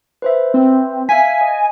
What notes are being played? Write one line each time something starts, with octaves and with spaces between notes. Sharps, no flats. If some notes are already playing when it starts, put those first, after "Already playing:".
B4 C5 E5
C4
E5 F5 G#5 B6
D#5